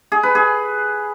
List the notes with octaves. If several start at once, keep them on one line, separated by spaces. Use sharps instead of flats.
G#4
B4
G#4